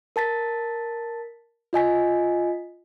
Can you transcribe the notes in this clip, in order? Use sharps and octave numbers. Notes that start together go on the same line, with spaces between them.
A#4 A5 A6 B6
F4 D#5 G#5 B6